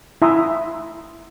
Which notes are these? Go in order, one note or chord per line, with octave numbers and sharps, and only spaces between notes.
E4 E5 A#5 C6 D#6